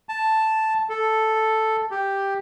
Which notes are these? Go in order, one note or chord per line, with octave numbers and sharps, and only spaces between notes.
A5
A4
G4